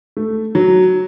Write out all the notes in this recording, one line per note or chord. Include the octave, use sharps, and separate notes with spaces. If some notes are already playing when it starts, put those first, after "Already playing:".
A3
F#3